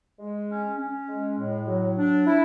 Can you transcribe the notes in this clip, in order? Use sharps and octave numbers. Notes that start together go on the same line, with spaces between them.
G#3
C#4
C#4
G#3
A2
F#3
D4
E4